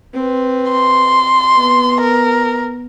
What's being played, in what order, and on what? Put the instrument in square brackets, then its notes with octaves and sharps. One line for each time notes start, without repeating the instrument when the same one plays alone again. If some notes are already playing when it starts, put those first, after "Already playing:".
[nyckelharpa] C4 B4
[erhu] C6
[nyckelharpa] B3
[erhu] A#4